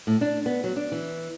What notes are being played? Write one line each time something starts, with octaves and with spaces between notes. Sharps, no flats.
A2
D4
B3
F#3
D4
E3